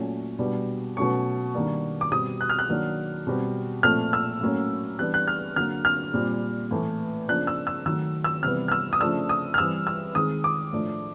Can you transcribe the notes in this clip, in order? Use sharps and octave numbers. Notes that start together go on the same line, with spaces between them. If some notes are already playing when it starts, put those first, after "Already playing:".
Already playing: A#2 F#3 A3 C#4
B2 G3 B3 D4
B2 F#3 A3 C#4 C#6
D#3 G3 A#3 D4
D6
B2 G3 C4 D#6
F#6
F6
F#6
D#3 F#3 A#3 D4
B2 G3 C4
A#2 F3 A3 C4 F6
E6
A2 F#3 A#3 C#4
E3 G3 B3 D4 F#6
F#6
F6
D3 F#3 A#3 F6
F6
A#2 G3 C4
A2 E3 A3
C#3 F3 A#3 D4 F#6
E6
E6
D#3 F#3 A3 E6
E6
C3 E3 G3 B3 F6
F6
E6
D#6
C#3 F3 A3 D4 E6
D#6
F6
E3 G3 C4 E6
E6
D#3 G#3 C4 D#6
D6
A2 F3 A3 D4